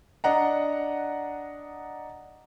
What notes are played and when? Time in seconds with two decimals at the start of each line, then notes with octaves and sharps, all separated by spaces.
0.24 D4 D#5 F#5 A#5